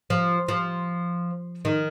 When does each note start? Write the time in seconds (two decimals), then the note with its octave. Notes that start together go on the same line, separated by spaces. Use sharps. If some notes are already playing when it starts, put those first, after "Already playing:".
0.10 F3
0.48 F3
1.65 D#3